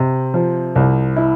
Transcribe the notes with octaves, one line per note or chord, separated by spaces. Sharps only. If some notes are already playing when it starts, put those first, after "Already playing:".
Already playing: C3 C4
F3
C2
E4